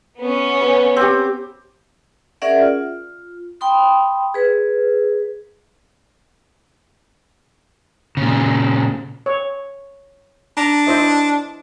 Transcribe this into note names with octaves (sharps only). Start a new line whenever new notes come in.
B3 C#4
B4
C4 G4
C#4 G#4 A#4 D5 E5 F#5
F4
G5 B5 C6 D#6
G#4 B4
A#2 C#3
C#5
D4 A#5
E4 C5 D#5